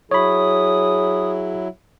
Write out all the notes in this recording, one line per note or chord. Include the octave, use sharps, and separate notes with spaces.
F#3 E4 G#4 C#5 B5 D#6